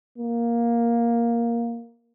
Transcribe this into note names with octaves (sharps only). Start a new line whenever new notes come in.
A#3